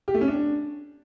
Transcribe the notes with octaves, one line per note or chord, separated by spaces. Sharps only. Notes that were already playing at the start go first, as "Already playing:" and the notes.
G4
A3
C#4
D4